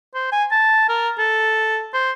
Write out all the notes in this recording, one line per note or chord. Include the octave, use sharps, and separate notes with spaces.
C5
G#5
A5
A#4
A4
C5